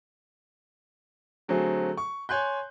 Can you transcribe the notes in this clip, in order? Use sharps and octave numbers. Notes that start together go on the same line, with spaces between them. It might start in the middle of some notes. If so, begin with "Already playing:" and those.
D3 F#3 A3 C4 G#4
C#6
C#5 G#5 C6 F#6 G6